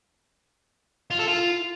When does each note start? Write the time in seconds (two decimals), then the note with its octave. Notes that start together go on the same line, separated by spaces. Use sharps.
1.11 F4
1.19 A4
1.28 F4